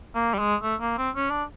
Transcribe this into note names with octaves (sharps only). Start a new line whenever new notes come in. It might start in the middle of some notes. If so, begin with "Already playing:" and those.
A#3
G3
G#3
A3
A#3
C4
C#4
D4